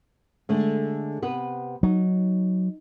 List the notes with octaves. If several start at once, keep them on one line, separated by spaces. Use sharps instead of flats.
D3 G#3 A3
C3 B3 B4
F#3 D#4